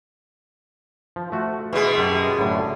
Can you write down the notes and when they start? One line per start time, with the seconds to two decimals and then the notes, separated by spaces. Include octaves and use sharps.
1.16 F3
1.32 A3 F#4
1.73 B2 E3 G#3
1.98 F#2 G4 A4
2.39 F#2 A2 D3